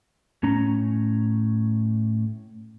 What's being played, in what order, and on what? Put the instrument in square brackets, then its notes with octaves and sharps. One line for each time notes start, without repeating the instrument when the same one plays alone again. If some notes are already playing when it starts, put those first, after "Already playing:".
[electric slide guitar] A2 C#4 A#5